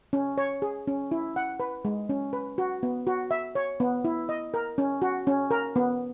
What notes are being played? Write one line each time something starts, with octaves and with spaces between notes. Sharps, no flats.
C#4
C#5
G#4
C#4
E4
F#5
B4
G#3
C#4
B4
F#4
B3
F#4
E5
C#5
B3
E4
D#5
A#4
C#4
F#4
C#4
A#4
B3